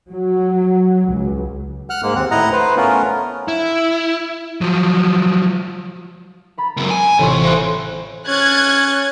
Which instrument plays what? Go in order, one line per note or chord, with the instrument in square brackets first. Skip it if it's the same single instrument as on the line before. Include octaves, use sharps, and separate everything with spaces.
[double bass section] F#3
C#2
[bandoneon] F#5 F6 F#6
G#2 G#3 A#3
D#2 C4 F#5
A2 E4 D#5 F#5 A#5
B4 C5
A3 B3 C#4 F4 A#4
[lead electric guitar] E4
F3 F#3
[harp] A#5 B5 A6
[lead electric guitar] C#2 F#2
G#5
[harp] D7 E7
[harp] A1 F4 C#6 [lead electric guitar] C3
[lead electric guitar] E4 C5 [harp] F5 C6 F#6
[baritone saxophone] C#4 [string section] F#6 G#6 A6